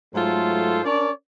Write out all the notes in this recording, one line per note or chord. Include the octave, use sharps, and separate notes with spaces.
G#2 F#3 A3 F4 A4 C5
C#4 D4 A#4 C#5 D5